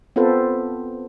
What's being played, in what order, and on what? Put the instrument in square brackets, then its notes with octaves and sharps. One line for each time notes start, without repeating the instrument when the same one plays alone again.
[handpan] B3 C4 F4 A4 B4 C5